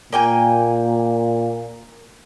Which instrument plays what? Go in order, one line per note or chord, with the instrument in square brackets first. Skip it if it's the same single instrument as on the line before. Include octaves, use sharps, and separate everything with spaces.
[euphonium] A#2 [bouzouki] A#3 G5 G#5